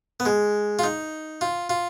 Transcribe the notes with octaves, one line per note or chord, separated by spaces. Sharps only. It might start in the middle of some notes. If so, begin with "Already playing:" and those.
B3
G#3
F4
D#4
F4
F4